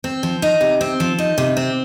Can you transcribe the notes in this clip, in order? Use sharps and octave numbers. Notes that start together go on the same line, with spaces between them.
C4
F3
D#4
C3
C4
F3
D#4
C3
C4